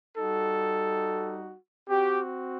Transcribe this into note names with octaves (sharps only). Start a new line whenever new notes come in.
G3 D#4 F#4 A4
C4 F#4 G4